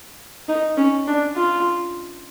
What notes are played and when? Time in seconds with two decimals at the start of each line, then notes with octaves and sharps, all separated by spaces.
0.49 D#4
0.77 C#4
1.07 D4
1.36 F4